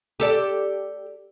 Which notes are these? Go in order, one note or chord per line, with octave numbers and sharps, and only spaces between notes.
G4 A4 D5